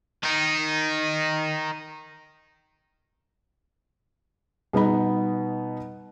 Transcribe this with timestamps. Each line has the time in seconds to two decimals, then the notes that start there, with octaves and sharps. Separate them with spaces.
0.23 D#3 D#4
4.73 B2 G3 B3 D#4 B5